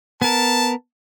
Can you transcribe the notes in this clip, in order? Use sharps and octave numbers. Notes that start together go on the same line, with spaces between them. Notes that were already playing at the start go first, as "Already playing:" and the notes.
B3 A#4 A5